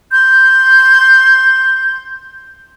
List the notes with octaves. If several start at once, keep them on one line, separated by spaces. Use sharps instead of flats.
C6 G6